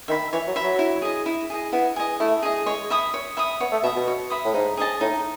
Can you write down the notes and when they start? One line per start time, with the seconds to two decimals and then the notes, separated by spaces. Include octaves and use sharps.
0.08 D#3 E5
0.12 B5
0.33 E3 C#5
0.47 F#3
0.56 E5 B5
0.63 F#3
0.79 E4
1.02 G#4 D#5
1.26 E4
1.50 G#4 D#5
1.72 B3 E4
1.96 G#4 D#5
2.20 A3 E4
2.43 G#4 D#5
2.66 G#3 C#5
2.90 E5 B5 D#6
3.14 C#5
3.37 E5 B5 D#6
3.60 B3 C#5
3.72 A3
3.83 B2 E5 B5 D#6
3.96 B2
4.07 C#5
4.30 E5 B5 D#6
4.45 A2
4.54 G#2 D#4
4.77 G#4 D#5 A5
5.01 A2 D#4